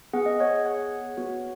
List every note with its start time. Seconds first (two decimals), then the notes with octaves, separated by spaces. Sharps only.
0.13 B3 G#4 F#5
0.26 D#5
0.40 C#5 F#5
0.65 C#5 F#5
1.17 B3 F#4